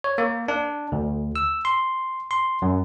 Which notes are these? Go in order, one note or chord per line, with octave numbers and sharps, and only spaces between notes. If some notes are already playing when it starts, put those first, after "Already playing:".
C#5
A#3
D4
D2
E6
C6
C6
F#2